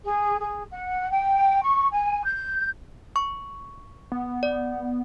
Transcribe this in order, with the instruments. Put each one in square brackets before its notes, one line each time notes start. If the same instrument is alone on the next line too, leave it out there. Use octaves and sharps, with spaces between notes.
[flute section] G#4
G#4
F#5
G5
C#6
G#5
G6
[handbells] C#6
[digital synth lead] B3
[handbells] D5